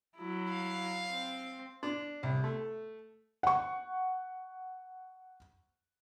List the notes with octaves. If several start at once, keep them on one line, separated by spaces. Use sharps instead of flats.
F#3 E4
F5
C4
D4
C2
A3
F#5 C#6